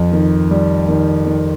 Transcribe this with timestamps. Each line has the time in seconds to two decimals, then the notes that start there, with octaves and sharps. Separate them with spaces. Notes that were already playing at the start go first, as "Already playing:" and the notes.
Already playing: F2
0.12 D#3
0.50 G3
0.89 D#3
1.26 D#3